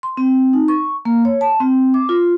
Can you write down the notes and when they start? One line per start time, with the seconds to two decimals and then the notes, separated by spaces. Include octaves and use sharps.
0.03 C6
0.17 C4
0.53 D#4
0.68 C#6
1.05 A#3
1.25 C#5
1.41 A5
1.60 C4
1.94 D6
2.09 F4